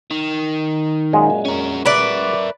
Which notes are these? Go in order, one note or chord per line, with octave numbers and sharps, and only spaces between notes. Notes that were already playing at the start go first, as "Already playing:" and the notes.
D#3
F#2 A#2 G#3
C#4 A#4
A#4 B4 D5 E5